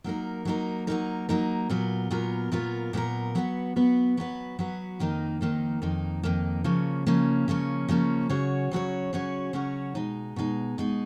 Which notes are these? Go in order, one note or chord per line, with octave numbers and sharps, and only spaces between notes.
F#3 A#3 D#4 A#4
F#3 A#3 D#4 A#4
F#3 A#3 D#4 A#4
F#3 A#3 D#4 A#4
A#2 F#3 B3 F4 A#4
A#2 F#3 B3 F4 A#4
A#2 F#3 B3 F4 A#4
A#2 F#3 B3 F4 A#4
F#3 B3 F#4 B4
F#3 B3 F#4 B4
F#3 B3 F#4 B4
F#3 B3 F#4 B4
F2 D#3 A#3 D#4
F2 D#3 A#3 D#4
F2 D#3 A#3 D#4
F2 D#3 A#3 D#4
C#3 F3 A#3 C#4
C#3 F3 A#3 C#4
C#3 F3 A#3 C#4
C#3 F3 A#3 C#4
C#3 F#3 C#4 F#4 C#5
C#3 F#3 C#4 F#4 C#5
C#3 F#3 C#4 F#4 C#5
C#3 F#3 C#4 F#4 C#5
B2 G#3 D#4
B2 G#3 D#4
B2 G#3 D#4